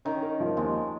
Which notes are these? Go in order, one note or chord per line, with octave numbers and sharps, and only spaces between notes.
D#3 C#4
A#4
F3
D#2 G#3